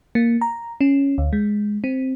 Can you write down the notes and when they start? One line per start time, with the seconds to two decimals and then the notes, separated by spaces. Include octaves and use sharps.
0.15 A#3
0.41 A#5
0.81 C#4
1.18 D2
1.33 G#3
1.84 C4